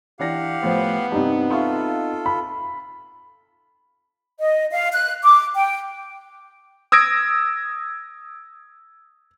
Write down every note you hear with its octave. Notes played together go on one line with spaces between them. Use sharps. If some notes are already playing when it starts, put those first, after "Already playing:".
E3 D4 G4 F5 F#5 A#6
A2 F3 B3 C5
G2 C3 C4 D#4
F4 A4 E5 F5 C#6
B5
D#5
F5
F#6
D6
G5
D#6 E6 G#6 A#6 D7